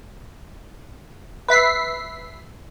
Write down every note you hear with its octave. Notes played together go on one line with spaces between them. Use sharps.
B4 E5 B6 C7